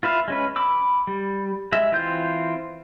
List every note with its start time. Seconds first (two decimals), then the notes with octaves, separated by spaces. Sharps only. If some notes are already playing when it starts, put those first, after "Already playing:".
0.03 F4 B4 E5 F5
0.28 G#3 C#4 B4
0.56 B5 D6 E6
1.07 G3
1.72 G#3 E5
1.92 E3 C4 F4 G6